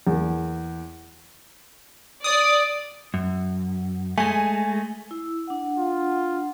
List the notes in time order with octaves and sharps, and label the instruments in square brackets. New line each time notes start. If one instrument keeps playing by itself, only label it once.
[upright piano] E2 A#3
[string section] D5 [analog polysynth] D#6
[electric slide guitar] F#2
[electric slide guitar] G#3 A3 [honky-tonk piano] G#5
[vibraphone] E4
D4 F#5
[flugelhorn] F4